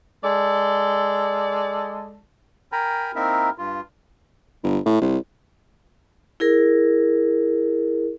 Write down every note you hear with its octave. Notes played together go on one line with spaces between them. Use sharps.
G#3 A4 D5
A#4 G5 G#5 A#5 B5
A#3 C4 D#4 E4 A#4 E5
G2 F4
G1
A2
C2
E4 G#4 A#4